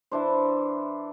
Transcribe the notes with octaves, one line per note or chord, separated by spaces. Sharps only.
E3 D4 C5